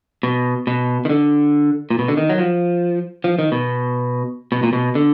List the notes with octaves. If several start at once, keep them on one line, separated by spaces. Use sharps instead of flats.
B2
B2
D#3
D3
A#2
B2
D3
D#3
F#3
F3
F3
D#3
B2
B2
A#2
B2
D3